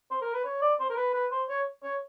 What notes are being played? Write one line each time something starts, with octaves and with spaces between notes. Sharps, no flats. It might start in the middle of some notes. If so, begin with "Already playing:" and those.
C5
A#4
B4
C#5
D5
C5
A#4
B4
B4
C5
C#5
C#5